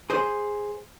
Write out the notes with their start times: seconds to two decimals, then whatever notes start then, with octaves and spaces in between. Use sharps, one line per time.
0.10 G#4 C5